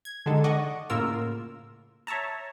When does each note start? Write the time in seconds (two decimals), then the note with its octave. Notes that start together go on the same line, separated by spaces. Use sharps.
0.05 G#6
0.26 D3 D#3 G#3 A4
0.44 D5 D#5 F#5 C#6
0.90 A2 C#3 A#3 F4 A#4 E6
2.07 C#5 E5 A5 A#5